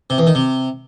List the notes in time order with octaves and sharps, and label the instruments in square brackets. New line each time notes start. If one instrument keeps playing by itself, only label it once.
[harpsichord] C3
E2
D#3
C3